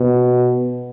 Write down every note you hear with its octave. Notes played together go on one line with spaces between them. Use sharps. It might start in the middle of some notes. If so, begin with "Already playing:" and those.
Already playing: B2